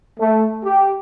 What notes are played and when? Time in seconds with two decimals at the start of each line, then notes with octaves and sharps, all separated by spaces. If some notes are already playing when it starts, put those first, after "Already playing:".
0.20 A3
0.64 G4